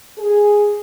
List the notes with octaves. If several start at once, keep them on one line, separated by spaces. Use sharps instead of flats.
G#4